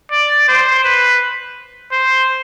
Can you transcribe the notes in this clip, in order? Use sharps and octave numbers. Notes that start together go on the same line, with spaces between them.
D5
C5
B4
C5